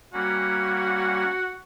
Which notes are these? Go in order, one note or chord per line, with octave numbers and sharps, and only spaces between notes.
G3 A#3 C#4 F#4